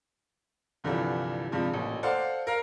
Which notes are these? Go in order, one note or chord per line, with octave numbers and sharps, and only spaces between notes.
C2 G2 D3 E3 F3 G3
G2 C3 F3 G#3
A1 A#2
A4 C5 D5 F5 F#5 A5
A#4 F5